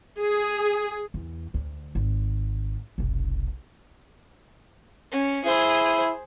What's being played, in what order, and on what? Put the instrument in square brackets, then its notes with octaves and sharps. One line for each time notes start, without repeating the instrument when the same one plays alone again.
[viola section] G#4
[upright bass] E2
D2
G#1
F1 B1
[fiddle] C#4
[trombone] E4 [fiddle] G#4 C5